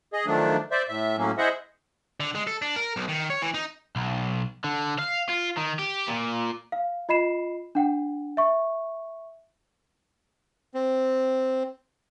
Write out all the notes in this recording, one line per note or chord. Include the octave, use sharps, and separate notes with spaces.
G#4 D#5
D#3 F3 F#3 A3 D4
C5 D5 E5
A2 E5
A2 F#3 A#3 C#4
E4 G#4 C5 D#5 E5 F#5
D3
G#3
A4
D4
A#4
B1
D#3
C#5
E3
D#4
B1
D3
F5
F4
D#3
G4
A#2
F5
F4 D#5 B5 C7 E7
D4 F#5 G5
E5 C#6
C4